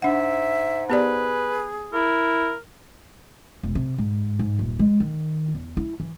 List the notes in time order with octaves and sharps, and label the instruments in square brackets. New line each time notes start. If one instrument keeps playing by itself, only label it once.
[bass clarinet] G#2 [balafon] D4 F#5 [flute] E5
[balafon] B3 G4 D5 [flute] G#4 [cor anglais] B4
[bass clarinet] E4 [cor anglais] A#4
[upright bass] E1
C3
G#2
G#2
D#1
G#3
D#3
E2
E4
E3